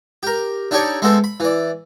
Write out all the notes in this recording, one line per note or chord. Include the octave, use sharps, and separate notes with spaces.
G4 A#4
D4 D#4 G4 A4 C#5 D5
G#3 A3 B3 C4 A4
B5
E3 D5